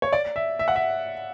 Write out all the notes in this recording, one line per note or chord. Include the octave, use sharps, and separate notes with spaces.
C#5
D5
E5
E5
F#5
E5